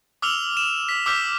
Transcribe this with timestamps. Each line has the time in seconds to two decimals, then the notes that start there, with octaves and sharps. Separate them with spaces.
0.22 D6 E6 F6 F7 G7
0.57 E7
0.89 B6
1.06 D6 E6 F6 G6 B6 F#7